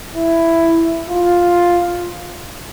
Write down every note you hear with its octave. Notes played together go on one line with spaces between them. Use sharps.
E4
F4